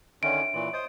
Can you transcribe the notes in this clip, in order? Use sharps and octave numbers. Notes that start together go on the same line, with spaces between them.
D3 D#3 C#4 C#5 E5 C6 D7
D4 G5
A#2 E3 C6 C#6
C5 D#5 D#6